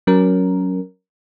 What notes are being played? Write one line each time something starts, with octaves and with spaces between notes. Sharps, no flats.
F#3 C#4 A#4